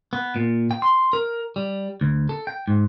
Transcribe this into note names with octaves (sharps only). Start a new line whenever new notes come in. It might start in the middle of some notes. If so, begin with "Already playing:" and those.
B3
A#2
G5
C6
A#4
G3
D2
A4
G5
G#2